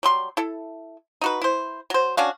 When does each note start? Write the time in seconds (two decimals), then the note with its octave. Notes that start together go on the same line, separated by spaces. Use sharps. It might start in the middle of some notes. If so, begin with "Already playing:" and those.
0.03 F#3 G3 C6
0.37 E4 A4
1.21 D#4 F#4 B4
1.41 E4 C5
1.90 F#3 C5
2.17 C#4 D4 F#4 F5